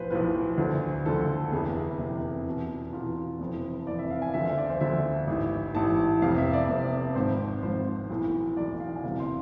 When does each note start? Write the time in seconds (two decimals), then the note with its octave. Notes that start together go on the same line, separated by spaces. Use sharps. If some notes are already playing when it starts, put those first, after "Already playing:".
Already playing: B1 A2 F3 B4 C5
0.11 B1 A2 F3 B4
0.58 D2 D3 F3
1.06 D2 D3 F3 A4
1.52 F1 E2 C3 G#4
1.99 F1 E2 C3
2.46 E2 B2
2.93 E2 B2 F4
3.40 F1 F2 E3
3.87 F1 F2 E3 D5
3.99 E5
4.10 F5
4.22 G#5
4.34 D2 D3 F3 E5
4.45 F5
4.58 D5
4.70 C5
4.80 D2 D3 F3 E5
5.27 A1 G#2 E3
5.74 A1 G#2 E3 A5
6.22 F1 F2 C3 F5
6.38 E5
6.53 D5
6.68 F1 F2 C3
7.15 G#1 G#2 F3 C5
7.63 G#1 G#2 F3 C5
8.10 B1 A2 E3
8.57 B1 A2 E3 D5
8.80 F5
8.96 G#5
9.04 E1 D2 C3 E3 F5
9.20 C6